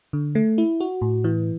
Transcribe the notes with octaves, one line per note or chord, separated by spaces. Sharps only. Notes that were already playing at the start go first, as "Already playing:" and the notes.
D3
A3
E4
F#4
A2
E3